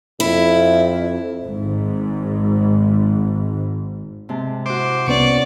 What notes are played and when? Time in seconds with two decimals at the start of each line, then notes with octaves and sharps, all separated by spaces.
0.20 F2 E4
1.42 G#1 G#2
4.29 C3 G#3 A5
4.66 E4 F#4 C5 D6
5.07 C2 B3 C#4 D5 C#6